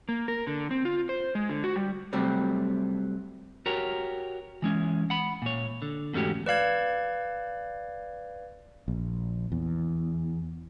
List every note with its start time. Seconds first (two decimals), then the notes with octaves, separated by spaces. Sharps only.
0.09 A#3
0.28 A#4
0.47 D3
0.71 C4
0.85 F4
1.09 C5
1.35 G#3
1.49 D3
1.64 F#4
1.76 G3
2.13 C3 F#3 G3 A3 C4
3.66 F#4 G4 A#4 C#5
4.62 E3 G#3 C#4
5.10 F#5 B5
5.42 A#2 C#5
5.82 D3
6.13 E2 G#2 A3 C#4 F#4 G4
6.46 B4 D5 F5 G#6
8.88 A#1
9.52 E2